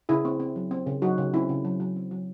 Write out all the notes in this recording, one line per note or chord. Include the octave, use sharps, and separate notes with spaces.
C#3 E4 G#4
C4
C4
F#3
C4
C#3
F#3 D#4 F#4
C#3
C4 C#4 E4
C#3
F#3
F#3
C4
F#3